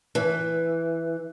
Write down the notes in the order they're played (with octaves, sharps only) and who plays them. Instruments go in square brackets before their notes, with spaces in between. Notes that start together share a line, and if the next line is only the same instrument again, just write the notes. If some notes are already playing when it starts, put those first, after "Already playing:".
[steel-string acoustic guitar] E3